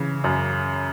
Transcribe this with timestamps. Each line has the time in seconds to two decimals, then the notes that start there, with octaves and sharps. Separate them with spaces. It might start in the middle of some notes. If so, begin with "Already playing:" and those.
Already playing: C#3 E3
0.24 F#2